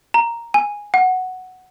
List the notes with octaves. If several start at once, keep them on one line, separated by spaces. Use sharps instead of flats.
A#5
G#5
F#5